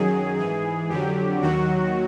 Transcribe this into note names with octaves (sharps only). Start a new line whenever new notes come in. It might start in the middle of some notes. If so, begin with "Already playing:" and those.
Already playing: F#2 D#3 F#3 G#4
G#2 E3 G#4
F2 D3 F#3 G4
D#2 D#3 F#3 F#4